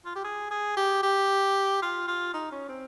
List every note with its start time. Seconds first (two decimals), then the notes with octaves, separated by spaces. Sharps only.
0.06 F4
0.15 G4
0.24 G#4
0.51 G#4
0.77 G4
1.03 G4
1.82 F4
2.08 F4
2.34 D#4
2.52 C#4
2.69 C4